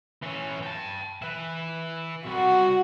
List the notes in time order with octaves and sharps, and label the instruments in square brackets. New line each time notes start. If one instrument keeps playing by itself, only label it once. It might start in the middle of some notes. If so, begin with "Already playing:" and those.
[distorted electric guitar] E3 C#4
G5 A5
E4 B4
[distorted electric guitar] C2 G3 [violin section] F#4